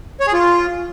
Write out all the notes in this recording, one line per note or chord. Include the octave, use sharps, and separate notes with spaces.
C#5
G#4
F4